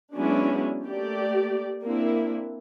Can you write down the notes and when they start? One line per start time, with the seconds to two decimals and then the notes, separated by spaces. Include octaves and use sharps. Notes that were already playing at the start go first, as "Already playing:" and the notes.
0.16 F#3 G#3 B3 C#4 D4 E4
0.84 A3 A#3 G4 D5
1.82 A#3 C4 D4 E4